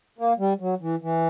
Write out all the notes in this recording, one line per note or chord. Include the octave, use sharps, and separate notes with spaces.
A#3
G3
F#3
E3
E3